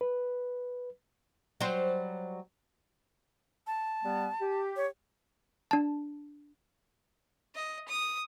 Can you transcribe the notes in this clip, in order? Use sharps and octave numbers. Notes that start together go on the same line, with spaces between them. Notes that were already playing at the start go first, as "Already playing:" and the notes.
B4
F#3 G3 C5
A5
G3 B3
G4
C#5
D4 A5
D#5
D#6